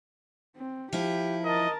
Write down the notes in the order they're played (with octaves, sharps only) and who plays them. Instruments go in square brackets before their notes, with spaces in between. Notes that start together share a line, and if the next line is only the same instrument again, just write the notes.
[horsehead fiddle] C4
[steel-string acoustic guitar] F3 E4 [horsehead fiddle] G4
[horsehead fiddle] A#4 A5 [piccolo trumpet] D#5